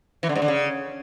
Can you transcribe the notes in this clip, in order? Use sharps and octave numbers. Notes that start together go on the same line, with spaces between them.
E3
D3
G#2
D3
C#3